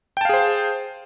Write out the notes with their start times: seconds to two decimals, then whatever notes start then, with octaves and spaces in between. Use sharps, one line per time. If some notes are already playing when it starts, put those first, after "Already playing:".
0.17 G5
0.21 A5
0.25 F5
0.29 G#4
0.34 C5